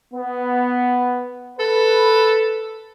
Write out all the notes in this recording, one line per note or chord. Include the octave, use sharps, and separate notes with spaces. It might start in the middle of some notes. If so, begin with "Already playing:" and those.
B3
A4 B4